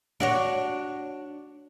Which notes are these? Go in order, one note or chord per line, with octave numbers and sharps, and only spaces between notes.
D4 F#4 C#5